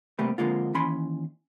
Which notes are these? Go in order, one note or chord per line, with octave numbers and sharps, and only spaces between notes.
C3 G3 A3 A#3 G4 B4
F2 G#2 D3 G#3 A#3 F4
D#2 E3 C#4 G#5 B5 C6